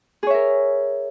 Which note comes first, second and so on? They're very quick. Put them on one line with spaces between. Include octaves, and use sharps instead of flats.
G#4 C#5 E5 A#4